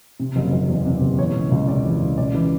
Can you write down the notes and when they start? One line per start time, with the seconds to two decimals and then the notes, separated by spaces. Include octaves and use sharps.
0.20 C3
0.36 F#1
0.53 F#1
0.69 E2
0.86 C3
1.02 F#1
1.18 E3 C#5
1.35 C#2
1.52 C#2
1.68 C3 D5
1.85 E3
2.02 C#2
2.18 C#3 D5
2.35 E3